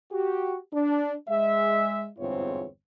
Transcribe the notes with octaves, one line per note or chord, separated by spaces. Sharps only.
F#4 G4
D4
G#3 E5
G1 E2 G#2 C4 F4 C#5